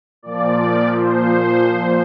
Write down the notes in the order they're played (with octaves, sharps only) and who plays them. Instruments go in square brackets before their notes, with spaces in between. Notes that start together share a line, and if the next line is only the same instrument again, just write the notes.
[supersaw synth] A#2 F3 D5
C5